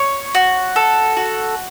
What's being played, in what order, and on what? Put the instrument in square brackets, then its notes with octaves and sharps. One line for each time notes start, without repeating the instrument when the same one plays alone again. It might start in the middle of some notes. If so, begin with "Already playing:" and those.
Already playing: [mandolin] C#5
F#4
A4
F#4